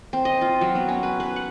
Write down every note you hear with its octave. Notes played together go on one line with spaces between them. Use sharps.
C4
D#5
F4
F#3
B3
C#4
B4
B4
F#5